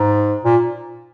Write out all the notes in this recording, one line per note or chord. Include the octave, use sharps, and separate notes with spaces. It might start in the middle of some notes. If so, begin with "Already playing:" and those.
Already playing: G#2
A#2